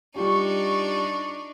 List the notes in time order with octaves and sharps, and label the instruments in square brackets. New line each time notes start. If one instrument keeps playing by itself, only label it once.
[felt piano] G3 F4 G4 [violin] D4 D#4 [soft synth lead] C#6